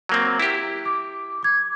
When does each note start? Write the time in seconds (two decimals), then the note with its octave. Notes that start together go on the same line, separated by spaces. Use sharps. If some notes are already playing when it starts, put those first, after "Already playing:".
0.09 F#3 A#3 C4
0.40 E4 G4
0.86 D6
1.43 D6 G#6